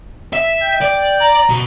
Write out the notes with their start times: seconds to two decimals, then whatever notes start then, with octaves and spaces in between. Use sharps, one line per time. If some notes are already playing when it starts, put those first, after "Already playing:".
0.33 E5
0.62 G5
0.82 D5
1.21 A#5
1.49 B2